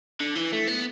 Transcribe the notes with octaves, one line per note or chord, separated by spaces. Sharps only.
D3
E3
A3
B3